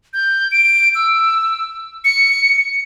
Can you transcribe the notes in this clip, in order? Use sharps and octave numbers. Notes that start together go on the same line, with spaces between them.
G6
D7
E6
C#7